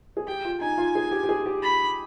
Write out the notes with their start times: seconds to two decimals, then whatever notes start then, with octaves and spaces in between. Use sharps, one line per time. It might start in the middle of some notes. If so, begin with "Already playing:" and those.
0.17 G#4
0.27 G4 G5
0.45 F4
0.61 D#4 G#5
0.78 F4
0.95 G#4
1.11 G4
1.23 G4
1.29 G#4
1.46 G4
1.63 B5